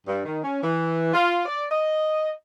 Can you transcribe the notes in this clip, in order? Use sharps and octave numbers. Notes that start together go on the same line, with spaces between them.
G2
D#3
C#4
E3
F4
D5
D#5